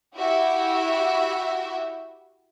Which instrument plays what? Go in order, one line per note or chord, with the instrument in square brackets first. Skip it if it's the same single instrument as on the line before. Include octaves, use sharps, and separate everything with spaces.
[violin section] E4 F#4 G4 E5